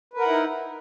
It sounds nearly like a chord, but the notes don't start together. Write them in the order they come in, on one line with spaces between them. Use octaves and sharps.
B4 A#4 F#5 E4 D#4